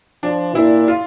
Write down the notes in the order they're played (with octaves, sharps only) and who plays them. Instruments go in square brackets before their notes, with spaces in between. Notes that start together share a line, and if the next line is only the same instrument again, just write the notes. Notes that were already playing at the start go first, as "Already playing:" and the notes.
[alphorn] F3 [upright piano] D4
[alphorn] A#2 [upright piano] E4
[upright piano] F4